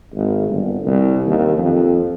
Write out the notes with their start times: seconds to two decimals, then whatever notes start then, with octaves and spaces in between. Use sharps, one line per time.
0.14 G#1
0.49 G1
0.86 C2
1.26 D#2
1.58 F2